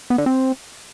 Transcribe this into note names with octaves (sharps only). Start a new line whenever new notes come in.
B3
D3
C4